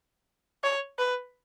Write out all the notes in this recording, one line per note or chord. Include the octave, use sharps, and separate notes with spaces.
C#5
B4